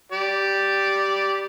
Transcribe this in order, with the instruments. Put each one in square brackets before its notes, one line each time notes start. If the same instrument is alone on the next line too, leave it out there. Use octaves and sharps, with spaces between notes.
[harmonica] G4 D5